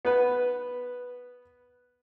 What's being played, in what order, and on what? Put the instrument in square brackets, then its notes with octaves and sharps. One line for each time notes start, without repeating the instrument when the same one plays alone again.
[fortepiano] B3 B4